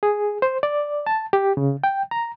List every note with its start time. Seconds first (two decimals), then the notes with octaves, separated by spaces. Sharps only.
0.03 G#4
0.42 C5
0.63 D5
1.07 A5
1.33 G4
1.57 C#3
1.84 G5
2.11 A#5